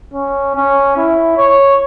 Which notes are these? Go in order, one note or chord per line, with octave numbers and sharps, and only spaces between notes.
C#4
C#4
E4
C#5